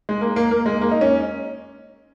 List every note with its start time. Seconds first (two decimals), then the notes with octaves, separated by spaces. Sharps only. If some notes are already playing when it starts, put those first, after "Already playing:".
0.09 G#3
0.21 A#3
0.36 A#3
0.51 A#3
0.66 G#3
0.81 A#3
0.91 D#4
1.01 C#4